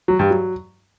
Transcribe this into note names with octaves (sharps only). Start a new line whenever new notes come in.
F#3
G2
F#3